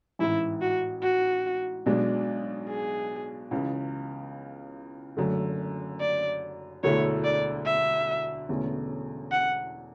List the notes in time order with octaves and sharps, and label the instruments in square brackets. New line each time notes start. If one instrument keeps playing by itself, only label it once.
[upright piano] A1 G#2 E3 [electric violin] E4
[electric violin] F#4
F#4
[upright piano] B1 B2 G#3 D4
[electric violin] G#4
[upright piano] C#2 C#3 E3
F#1 F#2 D3 A3
[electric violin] D5
[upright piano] E1 D2 D3 A3 E4 [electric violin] C#5
[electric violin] D5
E5
[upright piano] E1 E2 D3 A3 C#4
[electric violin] F#5